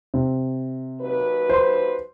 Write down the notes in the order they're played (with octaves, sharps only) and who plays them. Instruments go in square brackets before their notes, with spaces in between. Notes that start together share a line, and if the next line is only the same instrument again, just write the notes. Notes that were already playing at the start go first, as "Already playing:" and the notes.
[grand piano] C3
[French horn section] D#2 F#3 B4
[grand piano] C5 C6